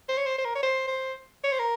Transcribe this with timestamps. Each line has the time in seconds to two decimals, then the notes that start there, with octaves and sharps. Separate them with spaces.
0.08 C5
0.17 C#5
0.26 C5
0.38 C5
0.45 A#4
0.55 C#5
0.63 C5
0.87 C5
1.44 C#5
1.52 C5
1.59 A#4